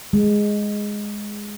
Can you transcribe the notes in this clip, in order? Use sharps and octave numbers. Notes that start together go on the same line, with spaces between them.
G#3